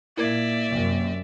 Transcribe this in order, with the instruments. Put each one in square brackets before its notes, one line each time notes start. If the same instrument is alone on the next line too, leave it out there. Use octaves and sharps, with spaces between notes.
[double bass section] A#2 [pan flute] A#3 [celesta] E4 A#4 G#6 [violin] D5 E5
[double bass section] F#2 C3